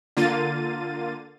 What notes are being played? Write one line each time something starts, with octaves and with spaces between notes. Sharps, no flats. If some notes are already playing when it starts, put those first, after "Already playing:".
D3 A#3 F4 A6 D#7